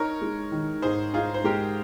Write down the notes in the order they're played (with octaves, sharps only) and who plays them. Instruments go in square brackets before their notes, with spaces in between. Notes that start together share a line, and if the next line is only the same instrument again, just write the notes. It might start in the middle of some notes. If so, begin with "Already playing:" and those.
Already playing: [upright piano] D#4 [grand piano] A#4 C#5
[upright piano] G#3
D#3
[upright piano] G#2 [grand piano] G#4 C5
[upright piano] D#4 [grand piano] F4 G#4
[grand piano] C5
[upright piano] G#3 [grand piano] G4 A#4